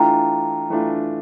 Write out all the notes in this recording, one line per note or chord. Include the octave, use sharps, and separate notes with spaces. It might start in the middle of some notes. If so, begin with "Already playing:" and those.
Already playing: E3 A3 D4 F4 G5 A#5
E3 A3 D4 F4